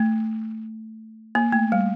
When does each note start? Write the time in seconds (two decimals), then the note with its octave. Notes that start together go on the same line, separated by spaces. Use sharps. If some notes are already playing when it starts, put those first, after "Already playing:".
Already playing: A3
1.35 A#3
1.52 A3
1.72 G3